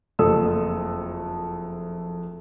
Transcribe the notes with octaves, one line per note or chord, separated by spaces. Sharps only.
F#1 F2 A3 A4 D#6 E6